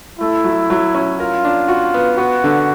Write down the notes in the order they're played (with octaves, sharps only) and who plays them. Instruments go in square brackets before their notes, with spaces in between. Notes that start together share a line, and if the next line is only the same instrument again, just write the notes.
[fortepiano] A3 [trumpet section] E4
[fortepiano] F#3
F#3
C#4
[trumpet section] F4 [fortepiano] A#4
[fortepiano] D4
F#4
B3
[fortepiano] B3 [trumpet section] F#4
[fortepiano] D3